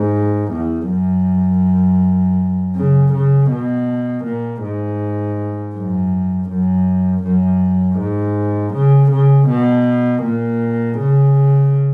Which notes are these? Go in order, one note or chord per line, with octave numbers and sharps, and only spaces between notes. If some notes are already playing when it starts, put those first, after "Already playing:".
Already playing: G#2
E2
F#2
C#3
C#3
B2
A#2
G#2
F#2
F#2
F#2
G#2
C#3
C#3
B2
A#2
C#3